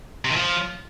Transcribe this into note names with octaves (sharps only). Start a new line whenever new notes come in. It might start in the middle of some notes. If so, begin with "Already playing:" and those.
C3
D#3
F3